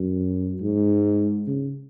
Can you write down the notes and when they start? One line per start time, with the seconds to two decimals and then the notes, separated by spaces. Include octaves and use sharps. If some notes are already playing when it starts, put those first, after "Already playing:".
Already playing: F#2
0.62 G#2
1.47 C#3